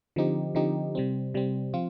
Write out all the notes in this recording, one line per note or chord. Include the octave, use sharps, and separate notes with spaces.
D3 F3 C4 D#4 G4
D3 F3 C4 D#4 G4
C3 G3 C4
C3 G3 C4
F3 C4 F4